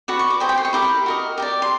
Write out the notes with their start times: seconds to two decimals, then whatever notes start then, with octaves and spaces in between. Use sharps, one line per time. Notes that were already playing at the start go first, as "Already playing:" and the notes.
0.08 F#4 B4 D5 C#6
0.19 C#6
0.30 D6
0.40 G4 C5 D#5 G#5
0.49 G5
0.58 C6
0.65 C#6
0.73 E4 G4 A#4 D6
1.06 F#4 A#4 D#5
1.38 G4 A#4 D5
1.62 C6